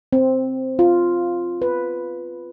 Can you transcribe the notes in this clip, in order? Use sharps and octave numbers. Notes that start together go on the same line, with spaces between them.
C4
F4
B4